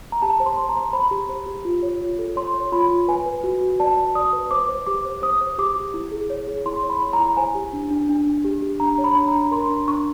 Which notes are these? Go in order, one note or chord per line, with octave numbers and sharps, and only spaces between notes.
A#5
G4 A5
C5
C6
C5
A#5
C5
C5 B5
G4
C5
G4
F4
C#5
F4
A4
C#5 C6
C#5
F4 B5
F4
B4 G#5
B4
F#4
F#4
D5 A5
D5
D5 D#6
B4
C5 D6
C5
G4 D6
C5
C5 D#6
C5
G4 D6
G4
E4
G#4
C#5
G#4
E4 C6
C#5
B5
E4
A#5
E4
C5 G#5
G4
D4
D4
D4
D4
G4
G4
D4 A#5
C#5
B5
D4
A#5
D4
A#4 C6
D4
D4 C#6